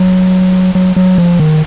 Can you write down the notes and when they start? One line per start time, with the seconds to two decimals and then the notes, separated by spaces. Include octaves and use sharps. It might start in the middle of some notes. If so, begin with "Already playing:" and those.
Already playing: F#3
0.75 F#3
0.96 F#3
1.18 F3
1.40 D#3